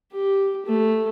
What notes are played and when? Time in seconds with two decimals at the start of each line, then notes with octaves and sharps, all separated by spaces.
0.12 G4
0.66 A3